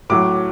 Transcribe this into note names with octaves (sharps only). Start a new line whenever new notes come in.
A2 F#3 D6